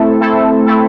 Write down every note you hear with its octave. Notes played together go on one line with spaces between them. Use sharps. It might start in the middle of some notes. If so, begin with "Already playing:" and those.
Already playing: A3 C4 E4 A4
A3 C4 E4 A4
A3 C4 E4 A4